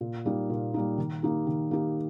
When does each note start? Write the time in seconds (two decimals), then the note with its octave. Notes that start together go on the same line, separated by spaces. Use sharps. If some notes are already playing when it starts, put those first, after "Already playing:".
0.01 A#2
0.26 G3 A#3 D#4
0.50 A#2
0.74 G3 A#3 D#4
0.98 D#3
1.22 A#3 D#4 G4
1.47 D#3
1.71 A#3 D#4 G4